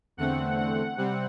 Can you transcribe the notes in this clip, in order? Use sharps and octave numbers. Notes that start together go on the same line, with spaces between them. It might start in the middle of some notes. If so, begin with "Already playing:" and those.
E2 D3 A3 C4 F#5
F#5
C3 G3 C4